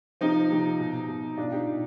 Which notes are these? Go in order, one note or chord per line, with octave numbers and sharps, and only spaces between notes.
C3 F3 C4 D#4
C3 F3
B2
B2
B2 D4 F4
D#4 G4
B2